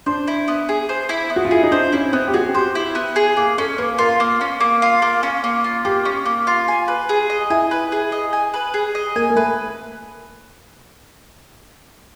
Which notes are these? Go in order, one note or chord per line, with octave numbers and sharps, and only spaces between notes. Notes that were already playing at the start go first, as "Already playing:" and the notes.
D4 C5
E4
B3
G#4
C5
E4
B3
F#4
F4
E4 G#4
D#4
D4 C5
C#4 E4
B3 C4
G4
F#4 G#4
G4 C5
E4
B3
G#4
A#3 G#4
C#4 A4
A#3 B4
F4 A#4
A#3
C#4
A#3
F4
A#3
C#4
A#3
F4
A#3 G4
C#4
A#3
F4
G#5
B4
G#4
D#5
E4 G#5
B4
G#4
D#5
G#5
B4
G#4
D#5
A#3 G#5
A#3
A3 B4